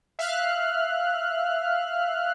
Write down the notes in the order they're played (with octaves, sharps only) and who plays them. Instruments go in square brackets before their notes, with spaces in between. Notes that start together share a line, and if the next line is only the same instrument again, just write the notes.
[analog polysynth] E5 F5 F6 F#6